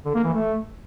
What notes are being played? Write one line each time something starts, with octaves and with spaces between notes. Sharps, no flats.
D3
A#3
E3
A3